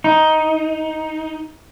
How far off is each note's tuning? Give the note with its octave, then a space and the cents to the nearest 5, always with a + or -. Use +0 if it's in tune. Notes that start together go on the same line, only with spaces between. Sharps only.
D#4 +10